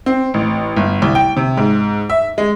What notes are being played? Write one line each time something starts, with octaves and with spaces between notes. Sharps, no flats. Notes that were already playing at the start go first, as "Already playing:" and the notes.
C4
A1
G1
C2
G5
C3
G#2
E5
G#3